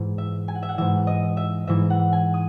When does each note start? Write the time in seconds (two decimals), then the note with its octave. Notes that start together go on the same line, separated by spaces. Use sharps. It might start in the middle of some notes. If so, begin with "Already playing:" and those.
Already playing: G#2 E3
0.18 E5
0.48 G#5
0.55 F#5
0.63 E5
0.69 F#5
0.78 G#2 E3 E5
1.07 D#5
1.37 E5
1.67 G#2 E3 E5
1.90 F#5
2.12 G#5
2.34 D#6